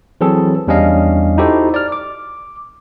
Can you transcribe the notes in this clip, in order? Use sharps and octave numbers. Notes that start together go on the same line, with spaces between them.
E3 F#3 C4 G#4 A4
E2 G3 C#4 D4 D#5 F5
D#4 E4 F#4 G4 A4 C5
D5 F6
D6